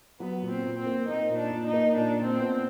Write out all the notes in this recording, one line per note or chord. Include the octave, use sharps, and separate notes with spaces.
F#3 B3
A#2
C4
A#2
C4
A#3
A#3 D#4
A#2
D4
A#2
D#4
A#3
A#2 D4
A#2
C4
B3